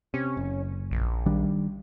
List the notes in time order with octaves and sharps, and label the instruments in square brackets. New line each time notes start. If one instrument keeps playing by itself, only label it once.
[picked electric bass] C3 [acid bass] C#4
[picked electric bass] F#1
[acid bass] A#1
[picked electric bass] D#3 G3 D4